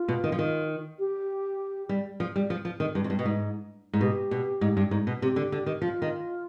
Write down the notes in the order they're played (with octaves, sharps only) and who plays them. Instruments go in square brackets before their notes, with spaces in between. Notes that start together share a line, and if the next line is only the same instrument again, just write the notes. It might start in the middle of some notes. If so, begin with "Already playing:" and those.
Already playing: [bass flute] F4
[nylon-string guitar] B2
D#3
F3
D#3
[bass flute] G4
[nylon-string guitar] G3
F3
G3
F3
F3
D#3
G2
F2
G2
B2
G#2
G#2
[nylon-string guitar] B2 [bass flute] G4
[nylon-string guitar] B2
G#2
G2
G#2
B2
[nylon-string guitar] C3 [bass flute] G4
[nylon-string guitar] D3
D3
D#3
[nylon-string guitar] F3 [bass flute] F4
[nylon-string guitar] D#3